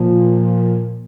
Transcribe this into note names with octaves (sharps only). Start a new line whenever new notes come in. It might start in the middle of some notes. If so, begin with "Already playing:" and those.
Already playing: A#2 F3